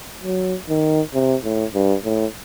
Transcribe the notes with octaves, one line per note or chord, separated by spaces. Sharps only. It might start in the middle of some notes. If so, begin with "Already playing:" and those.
F#3
D#3
C3
A2
G2
A2